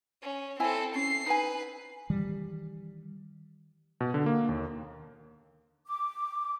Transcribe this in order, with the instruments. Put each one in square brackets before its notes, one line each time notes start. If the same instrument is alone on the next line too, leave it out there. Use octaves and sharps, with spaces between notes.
[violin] C#4
[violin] C4 A4 [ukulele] E4 G#5
[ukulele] C#4 [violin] C7
[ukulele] D#4 G#5 [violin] B4
[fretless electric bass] D#3 E3 G3
[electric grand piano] B2
D3
A#3
D#2
[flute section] D6